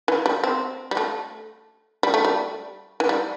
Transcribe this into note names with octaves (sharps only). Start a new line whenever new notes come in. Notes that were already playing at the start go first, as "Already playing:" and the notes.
E3
G3
C4
G3
A3
G3
A3
G3
E3
G3